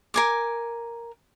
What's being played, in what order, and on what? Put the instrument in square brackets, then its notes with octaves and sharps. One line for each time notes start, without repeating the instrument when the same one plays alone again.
[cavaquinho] A#4 G#5 D6